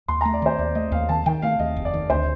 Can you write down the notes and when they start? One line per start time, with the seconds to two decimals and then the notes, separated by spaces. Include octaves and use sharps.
0.08 D#2 C6
0.21 A#5
0.25 A3
0.33 D5
0.42 D#3 C5
0.59 D#2 D5
0.75 A3 D#5
0.92 D#2 F5
1.09 D#3 A5
1.26 D#3 G5
1.42 A3 F5
1.59 D#2 D#5
1.76 F1
1.85 D5
1.94 D#3
2.10 D2 C5